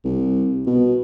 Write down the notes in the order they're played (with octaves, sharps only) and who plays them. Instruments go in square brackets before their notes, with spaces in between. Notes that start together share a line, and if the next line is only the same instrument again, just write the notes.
[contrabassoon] C2
B2